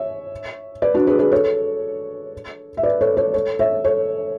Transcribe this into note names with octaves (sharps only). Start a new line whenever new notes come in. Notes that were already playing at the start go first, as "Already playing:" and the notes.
Already playing: C#5 E5
B4 D5
D4 F#4
G#4 B4
G#4 B4
A4 C#5
E5
B4 D5
A4 C#5
A4 C#5
A4 C#5
C#5 E5
A4 C#5